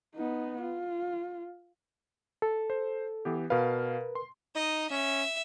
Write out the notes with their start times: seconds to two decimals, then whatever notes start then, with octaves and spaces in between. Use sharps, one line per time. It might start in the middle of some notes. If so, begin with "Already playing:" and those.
0.15 B3 D#4
0.62 F4
2.42 A4
2.70 C5
3.25 E3 B3 G4
3.50 B2 A#4 B4 F5
4.15 C6
4.55 D#4 D#5
4.91 C#4 E5